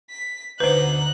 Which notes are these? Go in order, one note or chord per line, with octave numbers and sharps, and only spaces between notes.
B6
D2 B2 D#4 B4 C5 D6 F#6